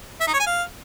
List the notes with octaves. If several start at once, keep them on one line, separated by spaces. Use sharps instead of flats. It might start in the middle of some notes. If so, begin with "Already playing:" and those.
E5
D#4
C#5
G#5
F5